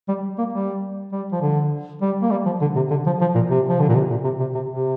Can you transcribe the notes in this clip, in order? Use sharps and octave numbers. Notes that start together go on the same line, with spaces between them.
G3
A#3
G3
G3
F3
D3
G3
A#3
G3
F3
D3
C3
D3
F3
F3
A#2
C3
F3
D3
A#2
C3
A#2
C3
C3
C3
C3